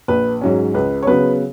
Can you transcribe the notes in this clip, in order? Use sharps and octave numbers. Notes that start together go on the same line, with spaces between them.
A#1 B4
G#2 F#3 C#4
C#2 B4
C#5
C#3 F#3 B3 B4